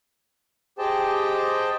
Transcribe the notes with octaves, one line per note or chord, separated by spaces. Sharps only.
G4 G#4 C5 D#5 G5 A5